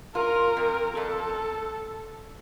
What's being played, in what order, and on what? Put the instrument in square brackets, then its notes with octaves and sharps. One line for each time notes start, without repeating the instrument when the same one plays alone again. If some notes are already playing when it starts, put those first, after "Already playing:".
[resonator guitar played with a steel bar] F4 [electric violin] A#4
[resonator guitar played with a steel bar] F2
[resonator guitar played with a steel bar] F2 [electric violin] A4